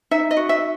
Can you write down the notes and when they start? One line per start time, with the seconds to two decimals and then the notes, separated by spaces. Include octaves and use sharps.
0.11 D#4 E5
0.31 D#5
0.37 F#4
0.49 E5